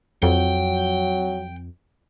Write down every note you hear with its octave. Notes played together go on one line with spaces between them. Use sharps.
F2 F#3 G5